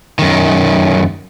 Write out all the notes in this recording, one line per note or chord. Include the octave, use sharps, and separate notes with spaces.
F#2 D#3